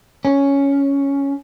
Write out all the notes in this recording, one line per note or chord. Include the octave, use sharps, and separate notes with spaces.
C#4